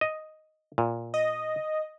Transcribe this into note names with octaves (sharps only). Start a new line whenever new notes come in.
D#5
A#2
D#5